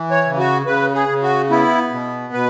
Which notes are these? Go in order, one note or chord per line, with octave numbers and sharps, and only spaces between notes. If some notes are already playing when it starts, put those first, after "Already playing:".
Already playing: E3
C#5
C#3
F#4
C#3 B4
G#4
C#3
F#4
B3 E4
B2
B2 B4